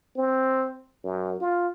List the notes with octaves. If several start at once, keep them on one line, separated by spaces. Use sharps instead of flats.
C4
F#2
F4